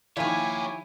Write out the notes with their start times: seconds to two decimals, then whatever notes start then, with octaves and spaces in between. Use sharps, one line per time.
0.17 D#3 F3 E4 G4 C#5 G#5